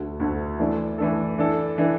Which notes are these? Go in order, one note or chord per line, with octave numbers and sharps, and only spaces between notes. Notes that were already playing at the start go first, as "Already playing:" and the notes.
Already playing: D2 D3 A3 F#4
D2 D3 A3 F#4
E3 A3 D4 A4
E3 A3 D4 A4
E3 D4 A4
E3 D4 A4